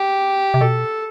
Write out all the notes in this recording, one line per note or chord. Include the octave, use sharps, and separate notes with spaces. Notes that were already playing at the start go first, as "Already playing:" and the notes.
Already playing: G4
C3
B2 A4